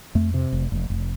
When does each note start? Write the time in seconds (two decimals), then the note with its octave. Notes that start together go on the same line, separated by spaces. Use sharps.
0.15 F2 A3
0.34 C3
0.52 F1
0.72 F1
0.90 F1